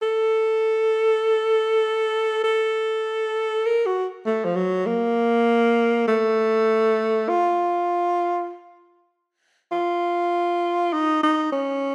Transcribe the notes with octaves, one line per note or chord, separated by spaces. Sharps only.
A4
A4
A#4
F#4
A3
F3
F#3
A#3
A3
F4
F4
D#4
D#4
C#4